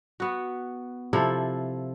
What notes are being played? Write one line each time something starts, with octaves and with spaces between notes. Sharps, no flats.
B3 F#4
C3 F3 E4 A4